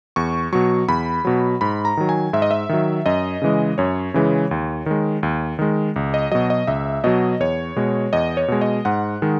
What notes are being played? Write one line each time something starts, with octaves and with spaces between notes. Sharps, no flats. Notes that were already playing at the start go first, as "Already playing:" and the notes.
E2 C#6
B2 F#3 C#6
E2 B5
B2 F#3
G#2 B5
A#5
D#3 F#3
G#5
G#2 E5
D#5
E5
D#3 F#3
F#2 D#5
C#3 E3 G#3
F#2 C#5
C#3 E3 G#3
D#2
D#3 G#3
D#2
D#3 G#3
C#2
D#5
B2 F#3 D#5
D#5
C#2 E5
B2 F#3 D#5
E2 C#5
B2 G#3
E2 D#5
C#5
B2 G#3
D#5
G#2 F#5
D#3 G#3